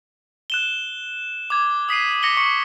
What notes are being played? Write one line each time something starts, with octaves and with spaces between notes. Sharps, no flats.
F#6 E7 G7
D6 G#6
D#6 B6 C7 D#7
D6 A#6 C#7 G7
C#6 C#7